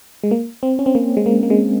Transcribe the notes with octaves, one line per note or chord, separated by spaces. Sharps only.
G#3
A#3
C4
C#4
C4
A#3
G#3
A#3
A#3
G#3